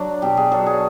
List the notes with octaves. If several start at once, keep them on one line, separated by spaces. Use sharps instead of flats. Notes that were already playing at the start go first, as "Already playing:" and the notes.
Already playing: F#3 D4
B2 G4
G#4
F#3 A4
G#4